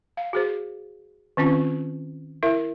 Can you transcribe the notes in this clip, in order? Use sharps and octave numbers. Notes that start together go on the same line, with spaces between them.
F5
F#4 G#4 C5
D#3 C4 C#4 F4
E4 A#4 E5